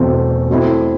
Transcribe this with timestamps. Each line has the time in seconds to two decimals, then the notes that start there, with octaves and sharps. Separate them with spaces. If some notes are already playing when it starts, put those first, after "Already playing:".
Already playing: E1 E2 B2 A3 C4
0.49 B2 A3 C4 E4